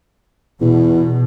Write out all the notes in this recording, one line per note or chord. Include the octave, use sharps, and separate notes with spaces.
E2 B2